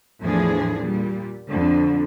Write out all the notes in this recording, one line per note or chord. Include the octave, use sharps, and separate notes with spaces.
E2 A2 F3 D4 G#4
A#2 G3
F2 D3